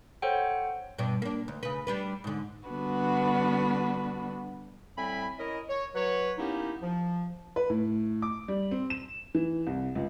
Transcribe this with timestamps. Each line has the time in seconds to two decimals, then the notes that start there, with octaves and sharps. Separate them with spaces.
0.22 A4 C5 C#5 F#5 G5
0.98 G2 B2 D4
1.22 A#3 D4
1.48 D2
1.63 C#3 B4
1.87 G3 D4 B4
2.24 G#2 D3
2.67 D3 G3 B3 D4 F#4 B4
4.97 A2 G3 C4 G#5 B5
5.38 C#4 E4 A#4 D#5
5.68 C#5
5.95 F#3 B4 C#5
6.38 A#3 B3 C#4 D#4 E4 G4
6.82 F3
7.56 B4
7.70 A2
8.22 D6
8.48 G3
8.71 C4
8.90 E7
9.35 E3
9.67 C2
9.95 C#2